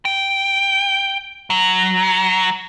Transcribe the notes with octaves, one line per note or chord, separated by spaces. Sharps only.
G5
F#3